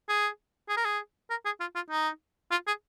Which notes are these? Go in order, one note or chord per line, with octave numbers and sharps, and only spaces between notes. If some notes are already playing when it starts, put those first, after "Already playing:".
G#4
G#4
A#4
G#4
A#4
G#4
F4
F4
D#4
F4
G#4